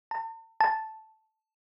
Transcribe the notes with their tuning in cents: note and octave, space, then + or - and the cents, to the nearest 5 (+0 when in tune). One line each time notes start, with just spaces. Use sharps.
A5 +40
A5 -5